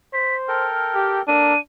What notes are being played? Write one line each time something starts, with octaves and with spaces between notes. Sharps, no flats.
C5 B6
A4 A#4 G5 F6
G4
A#3 D4 A4 A#4 D#7